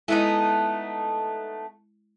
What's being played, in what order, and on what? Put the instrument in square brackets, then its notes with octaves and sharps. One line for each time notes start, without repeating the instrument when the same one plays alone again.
[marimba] G#3 E4 [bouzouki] A3 B3 D#4